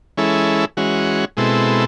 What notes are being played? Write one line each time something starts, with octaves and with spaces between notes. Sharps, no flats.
E3 G#3 C#4 E4 A4
E3 G#3 C#4 F#4
B2 G#3 C4 E4 A4